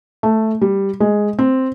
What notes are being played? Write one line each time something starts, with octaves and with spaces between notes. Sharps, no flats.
A3
G3
G#3
C4